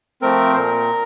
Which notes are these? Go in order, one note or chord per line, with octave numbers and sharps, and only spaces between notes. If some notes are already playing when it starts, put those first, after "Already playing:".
F3 A3 C4 A#4
C5
A#2 A#4